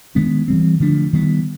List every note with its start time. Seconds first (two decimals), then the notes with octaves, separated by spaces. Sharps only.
0.15 D#3 G#3 B3 D4
0.48 E3 G3 C4
0.80 D3 F3 A3 D4
1.13 D#3 G3 B3